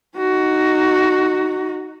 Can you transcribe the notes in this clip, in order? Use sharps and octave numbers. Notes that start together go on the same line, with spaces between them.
D#4 F#4